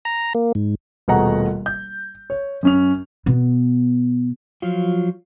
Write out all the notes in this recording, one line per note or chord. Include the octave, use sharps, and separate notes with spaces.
A#5
A#3
G#2
D#1 B2 A3 G#4 F#5 A#5
G6
C#5
F#2 C#4 F7
B2 B3
F3 F#3 F4